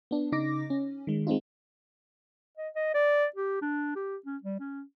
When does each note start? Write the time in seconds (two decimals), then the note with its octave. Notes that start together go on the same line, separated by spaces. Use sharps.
0.11 B3 D4
0.32 C#3 D#4 D6 A#6
0.70 C#4
1.07 D#3 G#3
1.27 G#3 C4 D#4 F4
2.58 D#5
2.76 D#5
2.95 D5
3.36 G4
3.61 D4
3.96 G4
4.26 C#4
4.43 G3
4.60 C#4